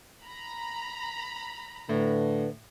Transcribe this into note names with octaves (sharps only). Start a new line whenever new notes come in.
A#5 B5
A2 D3 B4